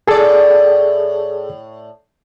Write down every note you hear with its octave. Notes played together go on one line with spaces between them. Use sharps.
A2 G#4 A4 D5